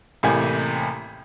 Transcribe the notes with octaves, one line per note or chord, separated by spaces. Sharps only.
A1 A2 C3 A#3 G#5